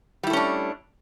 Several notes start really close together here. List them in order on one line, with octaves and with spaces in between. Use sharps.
G3 E4 A3 C#4 D4